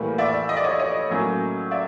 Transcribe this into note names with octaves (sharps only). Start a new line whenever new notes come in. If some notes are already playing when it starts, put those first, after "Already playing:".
Already playing: A2 E3 G3 A#3
D5 E5
D#5
D5
C#5 D#5
C#5 D#5
A2 F#3 A#3 C#4
D5 E5